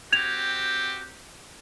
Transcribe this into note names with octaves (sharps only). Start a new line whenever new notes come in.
C4 F#4 G4 G#6 F7